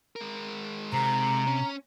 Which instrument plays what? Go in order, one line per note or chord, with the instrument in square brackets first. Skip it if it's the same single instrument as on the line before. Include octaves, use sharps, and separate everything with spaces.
[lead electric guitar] G#3 A#4
[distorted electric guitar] C3 [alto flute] A#5
[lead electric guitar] C#4